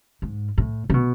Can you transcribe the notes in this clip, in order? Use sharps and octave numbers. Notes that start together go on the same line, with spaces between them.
G#2
A2
C#3
B2